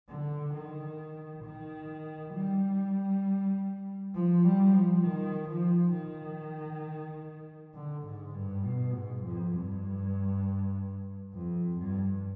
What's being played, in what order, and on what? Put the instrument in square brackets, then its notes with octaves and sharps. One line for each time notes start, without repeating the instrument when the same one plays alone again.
[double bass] D3
D#3
D#3
G3
F3
G3
F3
D#3
F3
D#3
D3
G#2
G2
B2
G#2
F2
G2
F2
G2